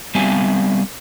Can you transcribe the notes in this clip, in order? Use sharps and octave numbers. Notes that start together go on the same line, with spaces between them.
G3 B3 C4 E5 F5 G#5